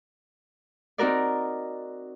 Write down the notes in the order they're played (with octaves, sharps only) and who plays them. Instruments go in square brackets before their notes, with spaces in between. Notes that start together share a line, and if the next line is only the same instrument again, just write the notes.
[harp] C4 D#4 F#4 A#4 D5